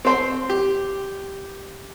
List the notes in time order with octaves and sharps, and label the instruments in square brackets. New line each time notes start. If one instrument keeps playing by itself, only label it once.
[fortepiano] C4 C5
G4